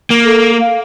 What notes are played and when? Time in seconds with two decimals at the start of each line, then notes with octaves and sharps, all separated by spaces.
0.10 A#3
0.25 A4
0.60 F5